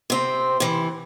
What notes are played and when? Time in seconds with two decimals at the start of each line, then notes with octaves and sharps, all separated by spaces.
0.10 C3 C4
0.60 C3 E3